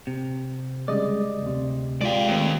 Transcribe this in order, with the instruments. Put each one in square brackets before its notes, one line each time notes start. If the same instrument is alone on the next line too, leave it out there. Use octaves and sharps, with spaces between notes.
[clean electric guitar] C3
[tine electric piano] C#3 G3 G#3 [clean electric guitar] D5 D#5
[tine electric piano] D2 C3
[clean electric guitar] G#3 F4 G4 [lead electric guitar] D5 F5
[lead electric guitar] D#2 [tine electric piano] A3 C4